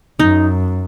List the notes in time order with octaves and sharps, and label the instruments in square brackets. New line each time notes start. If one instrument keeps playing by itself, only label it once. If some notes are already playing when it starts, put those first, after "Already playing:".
[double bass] F#2 [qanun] D#4